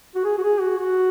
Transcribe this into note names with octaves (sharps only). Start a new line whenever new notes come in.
F#4
G#4
F#4
G#4
F#4
F#4